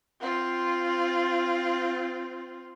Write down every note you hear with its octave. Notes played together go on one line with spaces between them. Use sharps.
C4 F4